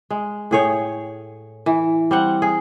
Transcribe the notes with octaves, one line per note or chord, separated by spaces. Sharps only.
G#3
A2 G#4 C#5 G5
E3
G3 C4 F#5
G#4